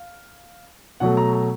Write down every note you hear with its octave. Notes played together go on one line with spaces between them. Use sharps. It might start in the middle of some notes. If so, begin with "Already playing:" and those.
Already playing: F5
B2 F#3 A3 F#5
A#5
A#5